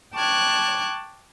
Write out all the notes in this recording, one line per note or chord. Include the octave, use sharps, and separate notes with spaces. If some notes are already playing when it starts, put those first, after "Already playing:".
G5 A5 C#6 D6 F#6 G#6